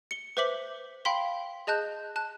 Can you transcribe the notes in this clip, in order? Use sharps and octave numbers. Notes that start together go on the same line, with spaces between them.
C#7 G7
B4 C5 E5 D6 B6 F#7
F5 G5 B5 C6 B6
G#4 D#5 A5 F#6 G6
A5 F#6